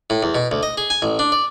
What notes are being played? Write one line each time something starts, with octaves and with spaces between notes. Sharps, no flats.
A2
E2
B2
D2
D#5
G#4
G#5
A1
D4
D5